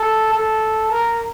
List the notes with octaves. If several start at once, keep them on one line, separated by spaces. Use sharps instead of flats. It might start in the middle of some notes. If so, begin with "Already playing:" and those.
Already playing: A4
A4
A#4